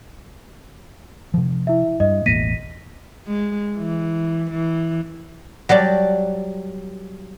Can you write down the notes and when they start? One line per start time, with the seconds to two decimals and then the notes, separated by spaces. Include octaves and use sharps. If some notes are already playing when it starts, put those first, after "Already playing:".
1.34 C3 F3
1.67 E4 E5
2.00 G2 D#5
2.26 E1 A1 A#3 A#6 B6 D#7
3.27 G#3
3.77 E3
4.51 E3
5.69 F#3 G3 D5 A5